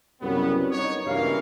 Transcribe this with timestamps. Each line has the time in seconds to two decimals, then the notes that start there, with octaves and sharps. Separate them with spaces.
0.21 C2 F#2 C#3 G3 B3
0.72 D#4 C#5
1.06 C#2 G2 B2 E3 A#3 F5